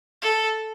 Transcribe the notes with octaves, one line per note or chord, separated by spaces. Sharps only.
A4